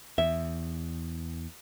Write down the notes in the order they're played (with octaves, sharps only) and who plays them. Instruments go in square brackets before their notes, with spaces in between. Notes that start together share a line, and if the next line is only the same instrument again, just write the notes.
[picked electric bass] E2 [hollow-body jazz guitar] E5